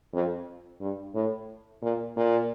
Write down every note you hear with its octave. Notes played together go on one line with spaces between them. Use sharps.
F2
G2
A2
A#2
A#2